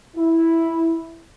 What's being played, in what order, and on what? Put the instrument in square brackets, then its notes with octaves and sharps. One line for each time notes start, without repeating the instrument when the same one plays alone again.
[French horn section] E4